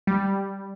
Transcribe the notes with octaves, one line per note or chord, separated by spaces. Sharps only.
G3